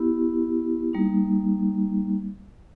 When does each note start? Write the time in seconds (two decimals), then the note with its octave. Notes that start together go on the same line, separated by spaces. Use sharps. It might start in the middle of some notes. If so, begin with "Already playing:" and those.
Already playing: B3 E4 G4
0.93 G3 A#3 D#4